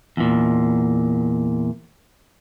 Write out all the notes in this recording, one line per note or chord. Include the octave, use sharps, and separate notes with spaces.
E2 A#2